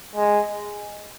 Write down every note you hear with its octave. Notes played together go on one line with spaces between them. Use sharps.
G#3